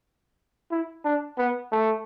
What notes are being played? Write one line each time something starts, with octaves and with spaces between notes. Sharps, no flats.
E4
D4
B3
A3